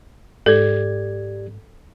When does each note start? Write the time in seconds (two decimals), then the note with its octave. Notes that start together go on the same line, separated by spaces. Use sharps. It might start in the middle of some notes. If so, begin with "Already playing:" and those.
0.46 G#2 G4 A4 D5 G#6